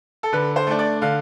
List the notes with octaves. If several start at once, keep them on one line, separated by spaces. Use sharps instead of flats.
A4
D3 B4
C5
A3 D4
D5
D3 F5